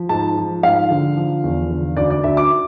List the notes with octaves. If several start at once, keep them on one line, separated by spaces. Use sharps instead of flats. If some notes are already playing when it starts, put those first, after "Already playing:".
Already playing: F3
G#2 A5
F3
G#2 F5
D3
F3
E2
D3
D2 D5
D5
D2 E5
D6